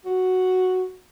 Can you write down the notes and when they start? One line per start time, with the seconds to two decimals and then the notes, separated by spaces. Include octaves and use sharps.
0.05 F#4